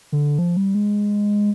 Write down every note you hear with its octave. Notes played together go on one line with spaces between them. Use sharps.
D3
F3
G3
G#3